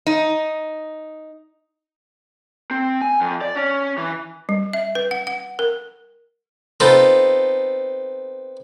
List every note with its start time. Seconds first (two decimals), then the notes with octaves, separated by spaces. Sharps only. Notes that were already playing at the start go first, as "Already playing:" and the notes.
0.07 D#4
2.71 C4
3.02 G#5
3.21 F2
3.41 D5
3.56 C#4
3.98 E3
4.49 G3
4.73 E5
4.95 B4
5.11 F#5
5.27 F#5
5.59 A#4
6.80 B3 C4 D#4 F4 A4